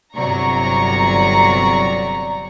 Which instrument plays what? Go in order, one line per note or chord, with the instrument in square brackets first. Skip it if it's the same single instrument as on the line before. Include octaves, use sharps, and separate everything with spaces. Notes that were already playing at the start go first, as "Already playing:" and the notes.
[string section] G1 C3 F#3 D5 A#5 C#6